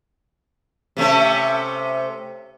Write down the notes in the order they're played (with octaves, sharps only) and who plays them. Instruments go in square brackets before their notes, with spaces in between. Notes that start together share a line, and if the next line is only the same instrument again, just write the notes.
[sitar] C3 A3 C#4